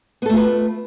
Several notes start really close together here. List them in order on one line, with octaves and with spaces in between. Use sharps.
B3 A4 A3 F4 B4